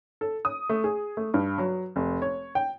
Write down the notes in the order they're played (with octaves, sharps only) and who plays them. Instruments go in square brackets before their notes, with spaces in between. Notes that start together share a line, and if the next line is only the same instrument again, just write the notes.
[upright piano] A4
D#6
A3
G#4
A3
G2
F#3
F1
C#5
G5